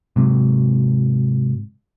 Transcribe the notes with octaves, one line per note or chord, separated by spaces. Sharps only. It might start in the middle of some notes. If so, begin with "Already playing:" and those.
G#2 C3 F#3